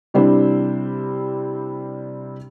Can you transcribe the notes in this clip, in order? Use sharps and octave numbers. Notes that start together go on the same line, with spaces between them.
C3 G3 C4 D4 E4 C5